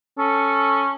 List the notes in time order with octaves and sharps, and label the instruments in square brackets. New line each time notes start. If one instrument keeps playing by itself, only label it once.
[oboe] C#4 [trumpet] A4